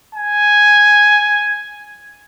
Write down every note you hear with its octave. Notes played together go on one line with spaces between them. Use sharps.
G#5